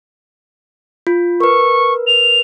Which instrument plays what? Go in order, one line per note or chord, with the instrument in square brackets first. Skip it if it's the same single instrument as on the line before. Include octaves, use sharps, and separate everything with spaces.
[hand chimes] F4
[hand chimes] A#4 B4 [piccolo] C#6
[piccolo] F7